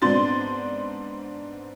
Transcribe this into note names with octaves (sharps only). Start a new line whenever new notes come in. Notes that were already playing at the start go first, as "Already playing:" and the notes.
G#2 B3 C4 D4 C6 A6